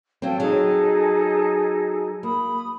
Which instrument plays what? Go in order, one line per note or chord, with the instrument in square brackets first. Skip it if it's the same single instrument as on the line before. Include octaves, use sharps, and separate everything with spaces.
[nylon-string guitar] F#3 C4 [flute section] A4 F5 G5
[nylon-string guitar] F#3 [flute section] D#4 G#4 A4
[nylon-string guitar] A#3 [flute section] B5 D#6